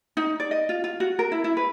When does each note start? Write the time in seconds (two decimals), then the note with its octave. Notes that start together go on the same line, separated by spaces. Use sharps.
0.17 D#4
0.40 D5
0.51 D#5
0.69 F4
0.84 F4
1.00 F#4
1.19 A#4
1.32 E4
1.44 E4
1.57 B4